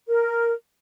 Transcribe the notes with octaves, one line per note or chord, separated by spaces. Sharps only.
A#4